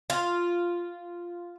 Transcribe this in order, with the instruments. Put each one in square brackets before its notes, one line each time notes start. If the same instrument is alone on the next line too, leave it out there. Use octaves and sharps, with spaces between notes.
[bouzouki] F4